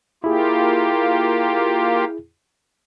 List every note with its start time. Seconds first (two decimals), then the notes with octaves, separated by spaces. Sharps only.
0.24 A#3 E4 F4 G4 G#4